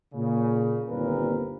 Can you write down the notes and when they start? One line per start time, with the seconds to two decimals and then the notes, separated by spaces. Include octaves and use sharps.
0.13 A#2 C#3
0.89 G1 D#2 A#2 C4 A#4 B4